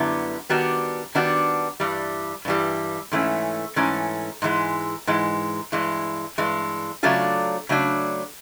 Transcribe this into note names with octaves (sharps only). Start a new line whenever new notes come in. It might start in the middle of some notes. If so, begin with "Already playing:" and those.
Already playing: F#2 D3 G3 B3 E4
D#3 G3 B3 D4 F#4
D#3 G3 B3 D4 F#4
G2 E3 G3
G2 E3 G3
G#2 E3 A3 C#4
G#2 E3 A3 C#4
G#2 E3 G#3
G#2 E3 G#3
G2 E3 G#3
G2 E3 G#3
C#3 F#3 A3 D4 F4
C#3 F#3 A3 D4